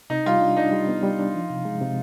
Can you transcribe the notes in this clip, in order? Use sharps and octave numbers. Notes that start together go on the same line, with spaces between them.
C3 D#4
G3 F4
D4
D4 D#4
G3
B3
G3
D4
F3
C3
G#3
C3